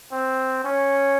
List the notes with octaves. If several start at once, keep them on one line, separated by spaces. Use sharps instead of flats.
C4
C#4